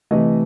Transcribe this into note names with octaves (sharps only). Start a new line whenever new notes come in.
C3 E3 A3 D#5